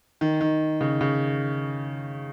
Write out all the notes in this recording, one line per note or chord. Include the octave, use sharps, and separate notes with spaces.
D#3
D#3
C#3
C#3